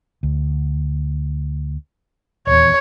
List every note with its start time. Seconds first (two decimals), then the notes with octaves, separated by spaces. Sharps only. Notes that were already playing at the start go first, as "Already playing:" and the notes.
0.23 D2
2.47 D#1 E2 C#5